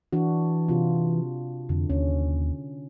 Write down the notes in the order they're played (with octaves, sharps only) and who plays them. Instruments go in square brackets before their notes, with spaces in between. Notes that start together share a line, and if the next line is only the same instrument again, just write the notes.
[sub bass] E3 [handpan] D4 F#4
[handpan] C3 F4
[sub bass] F2 [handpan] D3
[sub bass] D#2 [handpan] C#4